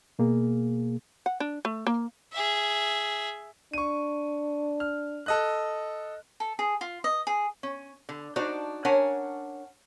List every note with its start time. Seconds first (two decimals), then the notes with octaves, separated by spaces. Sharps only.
0.19 B2 A#3 G#4
1.26 F#5
1.40 D4
1.65 A3
1.87 A#3
2.32 G#4 E5
3.73 D4 C#6 D#7
4.80 F6
5.26 A4 D#5 F#6
6.40 A4
6.59 G#4
6.81 F4
7.04 D#5
7.27 G#4
7.63 C#4
8.09 D3
8.36 D4 D#4 F#4 C5 D5
8.85 C#4 D4 A#4 C#5 F#5 G#5